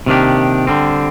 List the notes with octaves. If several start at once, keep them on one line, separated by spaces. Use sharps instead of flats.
C3 D#3 A#3 D4 G4
D3 G3 C4